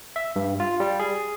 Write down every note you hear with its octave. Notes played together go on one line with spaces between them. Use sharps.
E5
G2
F4
G3
G#4